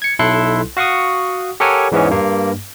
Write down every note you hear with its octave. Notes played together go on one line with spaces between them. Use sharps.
G#6 C#7
B1 E4 A4 C6 F#6
F#4 F5 F#5 C#6 D#6
G4 A4 A#4 C#5 F#5 G#5
E2 G#2 E3 G#3 B3 C#4
G2 A#3